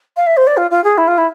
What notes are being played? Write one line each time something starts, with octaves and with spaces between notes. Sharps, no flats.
F5
E5
C5
D5
F4
F4
G#4
E4
F4
E4